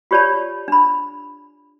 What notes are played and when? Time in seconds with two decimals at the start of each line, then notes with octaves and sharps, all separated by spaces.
0.11 F4 G4 C#5 D5 A5 B5
0.68 D4 B5